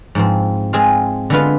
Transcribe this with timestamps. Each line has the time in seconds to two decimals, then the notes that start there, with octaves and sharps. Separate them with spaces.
0.15 G#2 F3 C4
0.73 G#3 C4 F4 G#4 C5
1.30 D3 G#3 B3 F4 B4